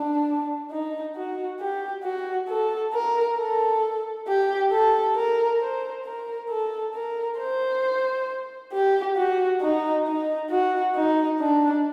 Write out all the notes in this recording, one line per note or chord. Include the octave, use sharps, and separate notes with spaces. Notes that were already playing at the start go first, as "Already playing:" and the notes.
Already playing: D4
D#4
F#4
G4
F#4
A4
A#4
A4
G4
A4
A#4
C5
A#4
A4
A#4
C5
G4
F#4
D#4
D#4
F#4
D#4
D4